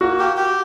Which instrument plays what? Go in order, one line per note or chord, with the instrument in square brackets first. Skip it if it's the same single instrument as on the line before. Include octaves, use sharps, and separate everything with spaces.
[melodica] A#3 [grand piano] F#4
[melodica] G4
G4